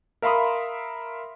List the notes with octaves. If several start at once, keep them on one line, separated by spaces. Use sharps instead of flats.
A#4 E5 F5 B5 C6 D#6